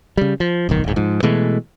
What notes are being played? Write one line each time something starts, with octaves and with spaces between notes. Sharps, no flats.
C#3 G3
F3
D1 B1 D#3
D#1 G#2
G#2 F3
B2 E3 G#3 A3